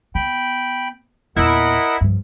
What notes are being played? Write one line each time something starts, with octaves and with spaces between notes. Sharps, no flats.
B3 G5 B5
E2 A#2 E4 A#4 D#5 F#5
G2 F3